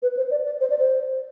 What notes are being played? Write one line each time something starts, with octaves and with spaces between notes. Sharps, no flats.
B4
C5
D5
D5
C5
D5
C5